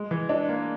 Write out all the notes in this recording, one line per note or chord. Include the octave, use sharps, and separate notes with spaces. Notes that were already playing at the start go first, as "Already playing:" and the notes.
Already playing: G#3
E3
D4
A#3